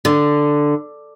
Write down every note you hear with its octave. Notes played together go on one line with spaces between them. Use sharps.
D3